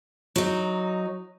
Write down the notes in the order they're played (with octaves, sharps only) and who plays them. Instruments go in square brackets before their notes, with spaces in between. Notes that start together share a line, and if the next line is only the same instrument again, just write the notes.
[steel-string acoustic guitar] F#3 D#4